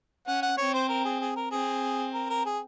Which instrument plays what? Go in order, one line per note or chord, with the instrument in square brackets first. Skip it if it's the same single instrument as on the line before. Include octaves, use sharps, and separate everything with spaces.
[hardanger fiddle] C#4 [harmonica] F#5
[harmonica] F#5
[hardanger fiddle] C4 [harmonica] C#5
[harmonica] C5
A#4
G#4
G#4
A#4
[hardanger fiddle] C4 [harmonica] G#4
[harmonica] A#4
A#4
G#4